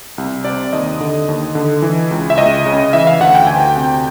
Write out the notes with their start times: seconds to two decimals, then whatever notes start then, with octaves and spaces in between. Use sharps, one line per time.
0.18 C2
0.45 C3 D5
0.73 D#2 D#5
1.01 D3
1.28 D#2
1.55 D3
1.82 E3
2.11 C#2
2.30 E5
2.38 C#2 D#5
2.66 C#3
2.93 E3 E5
3.07 F5
3.20 D2 F#5
3.35 G5
3.47 D2 G#5
3.60 G5
3.76 C3